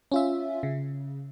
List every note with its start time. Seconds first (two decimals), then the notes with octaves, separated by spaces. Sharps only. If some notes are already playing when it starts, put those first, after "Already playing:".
0.12 C#4 F4 E5
0.63 C#3